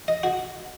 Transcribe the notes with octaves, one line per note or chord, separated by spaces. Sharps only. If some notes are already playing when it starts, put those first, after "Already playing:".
D#5
F#4